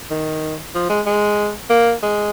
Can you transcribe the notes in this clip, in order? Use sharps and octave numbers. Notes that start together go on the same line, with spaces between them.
D#3
F3
G#3
G#3
A#3
G#3